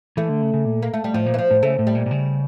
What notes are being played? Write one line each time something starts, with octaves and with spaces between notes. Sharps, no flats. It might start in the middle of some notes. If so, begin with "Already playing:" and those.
E3 A3
D3
C#3
C#3
A#2
A#3
A3
G3
A2 F3
A#2
E3
F3
A2
C#3 A3
A2
G3
A#2
A#2
C#3